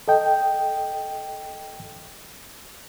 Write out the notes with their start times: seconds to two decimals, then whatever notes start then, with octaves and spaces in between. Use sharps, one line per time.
0.08 A4 D#5 G5